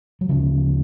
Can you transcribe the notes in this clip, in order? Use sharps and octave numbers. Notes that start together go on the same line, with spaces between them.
F#3
D2 C#3 F3